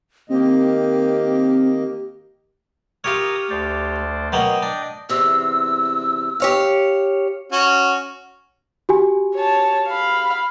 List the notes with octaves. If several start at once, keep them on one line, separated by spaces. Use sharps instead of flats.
D#3 A#3 C4 G4 D#5
F4 G4 A#4 C#5 D#6
D2 C5 D5
B2 F#3 A#3 D#5 G5
D4
E2 C3 E6
G4 C#5 F5
C#4 F#4
F#4 G4 G#5
C#5 A5
F5 B5